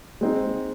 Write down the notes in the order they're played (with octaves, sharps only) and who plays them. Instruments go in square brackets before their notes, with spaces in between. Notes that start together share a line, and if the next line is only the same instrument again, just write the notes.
[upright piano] G#3 C4 D#4